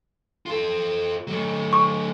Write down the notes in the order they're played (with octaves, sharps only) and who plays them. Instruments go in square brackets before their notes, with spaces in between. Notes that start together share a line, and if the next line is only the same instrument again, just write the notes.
[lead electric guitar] F4 A4
F#3 A3
[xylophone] C#6